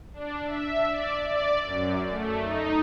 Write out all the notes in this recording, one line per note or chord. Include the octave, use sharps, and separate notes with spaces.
D4
E5
D5
D5
F#2
A3
D#4